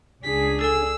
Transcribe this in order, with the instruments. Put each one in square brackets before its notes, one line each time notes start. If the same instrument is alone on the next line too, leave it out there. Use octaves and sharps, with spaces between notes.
[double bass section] C#2 [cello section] D4 G#4 [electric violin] B6
[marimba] A4 G#5 [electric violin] E6